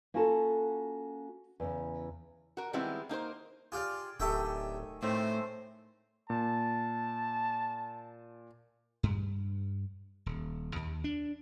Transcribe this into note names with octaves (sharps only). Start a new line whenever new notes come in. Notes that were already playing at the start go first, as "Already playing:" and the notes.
A#3 C#4 F4 F#4 A4 A5
E2 C#3
F#4 A#4
D#3 G3 G#3 B3 C4 E4
A#3 D#4 A#4 C5
F4 G4 G#4 D5 F5
D1 D#3 A3 G4 G#4 E5 G5
A2 D#3 A3 C4 C5
A#2 A5
G2
D#1
D#2
D4